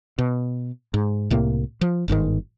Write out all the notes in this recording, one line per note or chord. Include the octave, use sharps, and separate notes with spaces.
B2
G#2
C2 A2 C3 A#3
F3
G1 G#2 D3 D#3